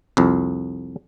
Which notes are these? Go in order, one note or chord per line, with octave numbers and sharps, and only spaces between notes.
C2 F2